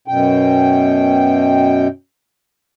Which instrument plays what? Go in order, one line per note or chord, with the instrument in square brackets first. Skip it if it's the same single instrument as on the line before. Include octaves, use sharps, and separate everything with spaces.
[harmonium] F#2 B2 G5